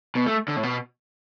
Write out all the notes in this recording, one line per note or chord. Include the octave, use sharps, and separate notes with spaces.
B2
A3
D3
A2
B2